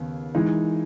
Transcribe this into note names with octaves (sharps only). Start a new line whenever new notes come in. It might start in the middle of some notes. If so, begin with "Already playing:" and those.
Already playing: D#2 C#3 B3
E3 G#3 D#4